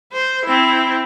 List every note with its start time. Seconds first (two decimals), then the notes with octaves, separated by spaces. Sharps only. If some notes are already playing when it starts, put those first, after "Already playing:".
0.13 C5
0.45 C4 E4